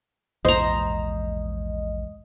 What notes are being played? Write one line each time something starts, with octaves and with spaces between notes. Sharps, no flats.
A#1 E2 G#2 C5 D#5 A#5